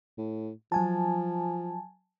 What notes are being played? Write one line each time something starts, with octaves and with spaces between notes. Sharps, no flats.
A2
F3 F#3 G#5 A5